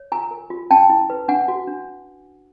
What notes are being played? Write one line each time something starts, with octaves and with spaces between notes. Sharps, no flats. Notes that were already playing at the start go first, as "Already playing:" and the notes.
Already playing: C#5
F4 G#5 A#5
A#4
F4
C#4 G5 A5
E4
B4
D4 F#5 G#5
F#4
D4